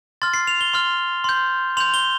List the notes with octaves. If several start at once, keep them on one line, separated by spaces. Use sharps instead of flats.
C6 F6 A6
C7
F7
G7
C6 F6
C6 G6
C6 G6 F7
G7